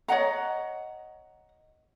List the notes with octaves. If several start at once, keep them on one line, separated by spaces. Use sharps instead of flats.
C#5 D#5 F#5 A#5